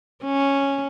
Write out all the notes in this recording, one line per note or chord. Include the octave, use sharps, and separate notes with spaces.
C#4